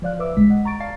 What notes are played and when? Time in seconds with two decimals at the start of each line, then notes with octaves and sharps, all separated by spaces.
0.02 F3 C5 D5 F5 F#6
0.19 B4 E5 D6 E6
0.37 A#1 B2 G#3 B6
0.50 D#5 F#5
0.65 A#5 C#6 A6 D7
0.80 D5 F5 A5 A#5 A6 C7